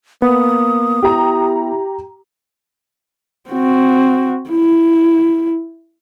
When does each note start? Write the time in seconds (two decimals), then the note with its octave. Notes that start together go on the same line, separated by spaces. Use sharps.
0.22 A#3 B3 D#6
1.03 E4 G4 A#5
3.50 C4 F#4
4.50 E4